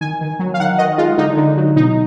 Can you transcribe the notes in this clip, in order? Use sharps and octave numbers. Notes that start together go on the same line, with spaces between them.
D#3 G#5
D#3
F#3
F5
D#3 F#5
D#3 D#5
G#3 F4
D3 D#4
D3
F#3
B2 D#4